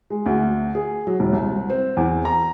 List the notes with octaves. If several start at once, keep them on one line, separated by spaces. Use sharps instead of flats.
G#3
D2
G#4
F#3
E1
C2
C4
E2
A#5